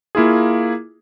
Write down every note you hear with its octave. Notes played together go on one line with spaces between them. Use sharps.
A#3 E4 F4 G#4